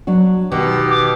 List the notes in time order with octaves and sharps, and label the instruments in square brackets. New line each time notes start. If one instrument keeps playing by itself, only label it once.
[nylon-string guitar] F#3 D4 F#4
[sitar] B2 [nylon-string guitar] D#3 [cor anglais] G4
[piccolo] D6